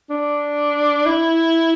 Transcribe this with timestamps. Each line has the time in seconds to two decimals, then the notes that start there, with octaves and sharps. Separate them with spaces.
0.10 D4
1.06 E4